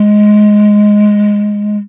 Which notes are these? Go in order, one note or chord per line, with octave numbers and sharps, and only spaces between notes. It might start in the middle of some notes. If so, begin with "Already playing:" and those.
Already playing: G#3